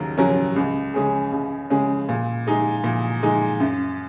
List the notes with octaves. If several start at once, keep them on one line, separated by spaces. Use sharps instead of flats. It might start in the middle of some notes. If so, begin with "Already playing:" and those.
Already playing: D#2 C#3 F#3 A#4
C#3 F#3 C#4 A#4
C#2
C#3 G#3 C#4 G#4
C#2
C#3 G#3 C#4 G#4
A#2
G#3 D#4 G#4
A#2
G#3 D#4 G#4
F#2